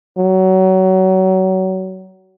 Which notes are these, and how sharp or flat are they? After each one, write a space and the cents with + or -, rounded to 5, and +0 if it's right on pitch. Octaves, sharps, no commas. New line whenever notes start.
F#3 +25